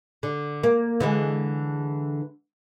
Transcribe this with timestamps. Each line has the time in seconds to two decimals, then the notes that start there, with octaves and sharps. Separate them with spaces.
0.23 D3
0.63 A#3
1.00 D3 E3 G#3